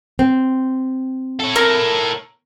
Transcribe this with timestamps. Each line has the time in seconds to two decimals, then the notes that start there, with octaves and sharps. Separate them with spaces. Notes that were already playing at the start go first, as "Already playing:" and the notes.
0.19 C4
1.40 A4 C#5
1.56 A#4 A#5